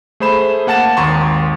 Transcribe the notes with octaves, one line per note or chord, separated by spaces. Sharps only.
A3 G#4 C5 B5 E7
A#3 F#5 A5 A6 E7
G#1 D#2 A#5 C6 C#6